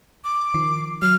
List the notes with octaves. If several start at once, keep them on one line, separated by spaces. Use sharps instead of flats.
D6
D#3 F3 C7
F#3 F6